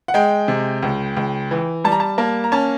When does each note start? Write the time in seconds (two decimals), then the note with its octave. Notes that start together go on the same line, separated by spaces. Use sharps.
0.08 F#5
0.14 G#3 G5
0.48 C3
0.83 C#2
1.17 C#2
1.51 E3
1.84 G3 A5
1.92 A#5
2.00 A5
2.18 A#3 A5
2.44 A#5
2.52 C#4 A5